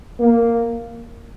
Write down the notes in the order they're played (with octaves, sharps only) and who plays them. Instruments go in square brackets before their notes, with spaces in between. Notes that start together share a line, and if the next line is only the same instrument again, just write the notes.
[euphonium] A#3